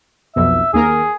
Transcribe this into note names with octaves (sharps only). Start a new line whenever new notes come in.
B1 F2 B2 E5
D#2 A#3 G#4 A#4